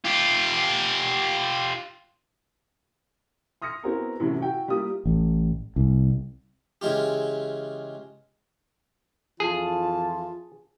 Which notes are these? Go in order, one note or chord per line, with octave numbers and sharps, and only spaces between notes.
F4 G4
C6 D#6 F6 A#6 C#7
B3 C4 E4 F#4 G#4 A#4
F#2 A2 C3 E3 F#3
E4 F#4 G5
G3 A#3 E4 F4 G4 D#6
A1
C2
C#3 E3 G#3 F4 G4
F2 E3 F4 G#4 A5